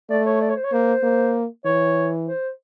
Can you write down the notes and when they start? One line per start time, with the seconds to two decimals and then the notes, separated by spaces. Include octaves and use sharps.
0.10 A3 D5
0.26 C#5
0.41 D5
0.49 C#5
0.56 C5
0.64 C#5
0.72 A#3 C5
1.03 A#3
1.65 E3 C#5
2.27 C5